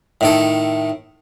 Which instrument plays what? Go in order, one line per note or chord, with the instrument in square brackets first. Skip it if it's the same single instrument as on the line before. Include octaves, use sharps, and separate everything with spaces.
[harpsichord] A2 D#3 A4